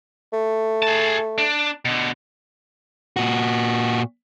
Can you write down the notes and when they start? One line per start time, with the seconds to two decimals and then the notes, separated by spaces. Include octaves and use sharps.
0.33 A3
0.82 G#4 A5
1.38 D4
1.85 B2 D3
3.17 A#2 F#4